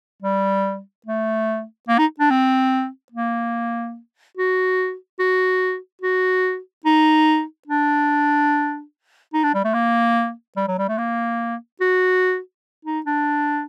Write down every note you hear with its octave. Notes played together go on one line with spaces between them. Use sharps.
G3
A3
A#3
D#4
D4
C4
A#3
F#4
F#4
F#4
D#4
D4
D#4
D4
G3
A3
A#3
G3
F#3
G3
A3
A#3
F#4
D#4
D4